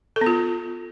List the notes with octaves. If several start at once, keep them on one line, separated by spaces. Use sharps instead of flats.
A4
B3
F4